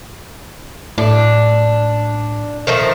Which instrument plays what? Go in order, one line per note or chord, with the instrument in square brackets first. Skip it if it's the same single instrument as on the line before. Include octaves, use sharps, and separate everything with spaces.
[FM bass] A2 [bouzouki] D4
[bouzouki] D#3 F3 A3